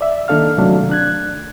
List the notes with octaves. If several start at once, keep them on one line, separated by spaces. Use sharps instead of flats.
D5 E5
D#3 A#3 D4 A4 F5 F6
C3 D#3 F#3 A3 D4
D4 F#6 G#6